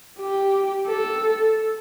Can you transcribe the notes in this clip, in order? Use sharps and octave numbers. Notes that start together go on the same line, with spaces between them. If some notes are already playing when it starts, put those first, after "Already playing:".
G4
A4